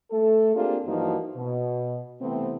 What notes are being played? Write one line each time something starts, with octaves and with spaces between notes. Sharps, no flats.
A3 A4
A#3 C4 D4 F4 G4 G#4
G2 E3 F3 A#3 D#4 F#4
B2
C3 E3 A3 B3 C4